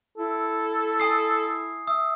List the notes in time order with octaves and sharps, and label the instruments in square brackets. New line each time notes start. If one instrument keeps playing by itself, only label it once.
[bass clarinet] E4 [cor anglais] A4
[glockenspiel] G#5 D#6 C7
[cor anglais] E5 [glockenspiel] D#6